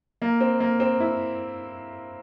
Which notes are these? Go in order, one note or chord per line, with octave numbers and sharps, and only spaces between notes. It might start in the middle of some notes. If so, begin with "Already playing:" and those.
A#3
C4
A#3
C4
E4